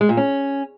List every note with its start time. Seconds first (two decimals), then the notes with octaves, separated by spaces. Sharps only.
0.01 G#3
0.09 A#2
0.17 C#4